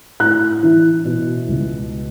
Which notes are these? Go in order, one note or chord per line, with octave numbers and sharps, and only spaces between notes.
A2 F#6
E3
B2
C#2